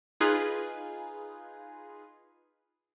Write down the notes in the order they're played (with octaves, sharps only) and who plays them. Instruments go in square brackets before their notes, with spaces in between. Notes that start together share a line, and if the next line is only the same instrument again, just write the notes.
[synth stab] D#4 F4 G#4 B4